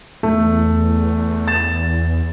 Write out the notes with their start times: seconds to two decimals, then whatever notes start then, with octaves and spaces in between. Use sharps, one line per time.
0.23 E2 A3
1.48 A6 E7